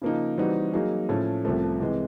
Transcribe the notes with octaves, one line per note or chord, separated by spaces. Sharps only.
C#3 F3 A#3 D#4
E3 G3 C4 D#4 F#4
F#3 A#3 D#4 G#4
A2 F3 A3 C#4
C2 C3 F3 A3
C3 E3 G#3